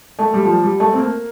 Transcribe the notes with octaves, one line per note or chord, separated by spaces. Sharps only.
A3
G3
F3
G3
A3
C4
A#3